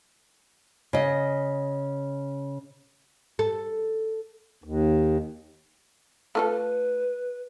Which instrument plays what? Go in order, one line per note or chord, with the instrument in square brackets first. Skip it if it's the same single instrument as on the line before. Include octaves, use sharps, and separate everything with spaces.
[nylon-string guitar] C#3 D#5
[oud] A4
[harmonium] D#2
[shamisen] A3 F4 A4 [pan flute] B4